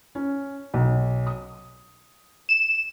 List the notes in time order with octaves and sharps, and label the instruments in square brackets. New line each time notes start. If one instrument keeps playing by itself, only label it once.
[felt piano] C#4
B1
D#6
[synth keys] E7